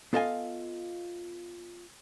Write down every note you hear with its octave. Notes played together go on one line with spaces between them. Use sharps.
B3 F4 A4 D#5 F5 G#5